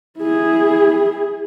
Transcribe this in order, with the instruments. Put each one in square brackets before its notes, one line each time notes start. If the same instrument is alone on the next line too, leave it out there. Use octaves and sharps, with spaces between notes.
[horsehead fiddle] E4 G#4